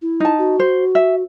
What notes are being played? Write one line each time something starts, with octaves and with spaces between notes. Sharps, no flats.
E4
D#4 A5
F#4
C5
E5